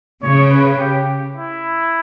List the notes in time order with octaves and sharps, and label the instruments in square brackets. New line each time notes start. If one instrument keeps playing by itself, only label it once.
[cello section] C#3 [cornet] C#5
[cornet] B4
G4
E4